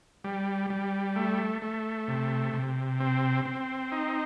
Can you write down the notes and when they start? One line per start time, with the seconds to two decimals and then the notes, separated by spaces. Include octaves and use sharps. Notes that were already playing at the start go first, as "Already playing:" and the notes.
0.24 G3
0.70 G3
1.16 A3
1.62 A3
2.08 C3
2.53 C3
3.00 C4
3.45 C4
3.92 D#4